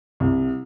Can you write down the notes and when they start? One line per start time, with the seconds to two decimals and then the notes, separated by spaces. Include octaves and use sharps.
0.20 C2